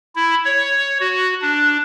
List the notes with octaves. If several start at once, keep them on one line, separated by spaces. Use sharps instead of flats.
E4
C#5
F#4
D4